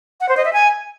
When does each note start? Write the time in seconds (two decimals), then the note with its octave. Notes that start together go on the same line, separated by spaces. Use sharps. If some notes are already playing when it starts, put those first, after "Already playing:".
0.21 F#5
0.29 C5
0.37 D#5
0.45 E5
0.53 G#5